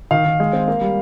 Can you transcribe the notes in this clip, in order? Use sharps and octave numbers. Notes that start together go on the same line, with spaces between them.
D#3 F5
D#3
G#3
C4
A#3
G3